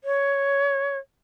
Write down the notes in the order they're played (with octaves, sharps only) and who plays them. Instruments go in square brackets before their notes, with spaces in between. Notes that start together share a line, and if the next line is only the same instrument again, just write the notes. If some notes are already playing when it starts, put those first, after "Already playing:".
[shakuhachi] C#5